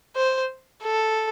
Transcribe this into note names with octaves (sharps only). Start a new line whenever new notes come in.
C5
A4